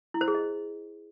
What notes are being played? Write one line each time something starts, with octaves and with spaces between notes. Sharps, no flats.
E4
C5
G#4
D#5